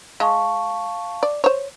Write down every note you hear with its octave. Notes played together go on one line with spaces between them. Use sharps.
G#3 F5 A5 C#6
D5
C5 C#5